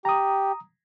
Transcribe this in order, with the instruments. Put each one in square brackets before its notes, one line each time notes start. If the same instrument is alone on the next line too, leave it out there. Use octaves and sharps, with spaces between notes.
[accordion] G4 [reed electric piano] A#5 D#6